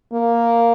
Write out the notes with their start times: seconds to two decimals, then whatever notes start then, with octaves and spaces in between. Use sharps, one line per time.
0.13 A#3